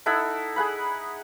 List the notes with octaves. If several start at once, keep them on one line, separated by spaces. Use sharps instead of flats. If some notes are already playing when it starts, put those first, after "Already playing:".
D#4 E4 A4 F#5
G#4 F#5 B5